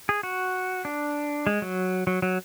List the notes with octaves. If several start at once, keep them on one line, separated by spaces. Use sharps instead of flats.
G#4
F#4
D4
G#3
F#3
F#3
F#3